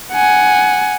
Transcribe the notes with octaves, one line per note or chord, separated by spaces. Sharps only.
F#5 G#5